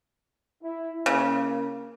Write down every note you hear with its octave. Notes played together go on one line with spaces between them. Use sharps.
E4
C#3 A#3